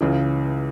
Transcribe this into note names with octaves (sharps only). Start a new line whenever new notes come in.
C#2 C#3 E3